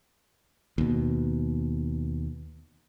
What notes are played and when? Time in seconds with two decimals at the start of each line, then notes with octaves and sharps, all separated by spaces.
0.78 D#2 B2